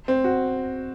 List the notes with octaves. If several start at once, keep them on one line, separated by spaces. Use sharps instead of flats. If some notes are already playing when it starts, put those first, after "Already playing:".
C4
F#4